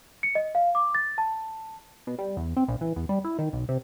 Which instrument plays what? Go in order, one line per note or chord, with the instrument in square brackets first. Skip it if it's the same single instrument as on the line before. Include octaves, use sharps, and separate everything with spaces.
[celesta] C#7
D#5
F5
D6
A6
A5
[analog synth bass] B2
G3
E2
C4
A#1
E3
E2
G3
E4
D#3
B1
C3